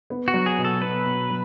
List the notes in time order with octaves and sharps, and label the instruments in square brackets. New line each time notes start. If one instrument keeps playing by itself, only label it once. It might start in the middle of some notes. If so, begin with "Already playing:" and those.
[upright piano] B3
[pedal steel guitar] F#4
[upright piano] F#3
[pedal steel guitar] G#4
[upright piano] B2
[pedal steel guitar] A4
[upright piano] B3 [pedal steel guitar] B4
[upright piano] B2
F#3